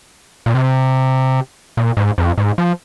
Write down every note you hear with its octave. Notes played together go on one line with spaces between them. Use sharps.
A#2
C3
A#2
G#2
F2
G#2
F3